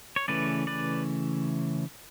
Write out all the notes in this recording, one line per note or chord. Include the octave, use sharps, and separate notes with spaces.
C#5
C#3 E3 A3 C#4 B4 D5
B4 D5